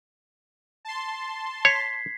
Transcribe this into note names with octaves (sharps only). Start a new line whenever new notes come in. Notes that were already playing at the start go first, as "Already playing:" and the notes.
A5 C6
C#5 G#6 B6 C7